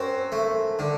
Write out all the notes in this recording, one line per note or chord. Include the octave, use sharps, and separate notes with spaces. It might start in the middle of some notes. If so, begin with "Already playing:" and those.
Already playing: F#2 C4 C5
A3
D3